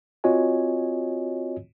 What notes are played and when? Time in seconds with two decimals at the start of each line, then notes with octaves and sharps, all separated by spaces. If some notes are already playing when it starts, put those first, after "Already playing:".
0.24 C4 F4 F#4 C#5 D#5 G#5